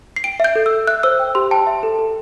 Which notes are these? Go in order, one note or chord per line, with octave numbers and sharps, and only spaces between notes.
C7
G5 D7
E5 G6
A4
E6
A4
E5 F#6
C5 E6
G5
G4 C6
G5 A5
E5
A4
A4